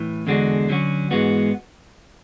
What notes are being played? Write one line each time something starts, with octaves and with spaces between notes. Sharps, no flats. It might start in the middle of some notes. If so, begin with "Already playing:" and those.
Already playing: A2 E3
E2 D3 G#3 D4 F#4
D3 F#3 C#4 F#4
G#2 E3 G#3 B3 F#4